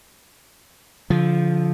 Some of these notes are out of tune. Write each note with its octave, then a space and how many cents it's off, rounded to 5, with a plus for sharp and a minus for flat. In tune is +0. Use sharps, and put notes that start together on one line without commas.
D3 -35 F3 +0